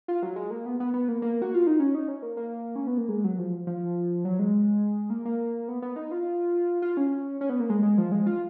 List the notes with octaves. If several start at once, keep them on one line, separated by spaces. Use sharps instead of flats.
F4
F#3
G#3
A#3
B3
B3
B3
A#3
A#3
F#4
F4
D#4
C#4
D#4
C#4
A#3
A#3
C#4
B3
A#3
G#3
F#3
F3
F3
F#3
G#3
A#3
A#3
B3
B3
D#4
F4
F4
C#4
C#4
B3
A#3
G#3
G#3
F3
G#3
F4